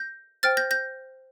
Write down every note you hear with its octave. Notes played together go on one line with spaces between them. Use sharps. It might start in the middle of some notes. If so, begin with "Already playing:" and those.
Already playing: G6 A#6
C5 G5 F6 A6
G6 A#6
G6 A#6